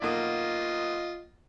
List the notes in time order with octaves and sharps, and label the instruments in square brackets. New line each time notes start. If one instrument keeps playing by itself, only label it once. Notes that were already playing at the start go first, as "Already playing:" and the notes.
[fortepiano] B1 A#3 D#6 [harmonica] F4 D#5